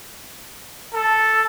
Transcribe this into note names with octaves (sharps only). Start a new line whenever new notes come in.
A4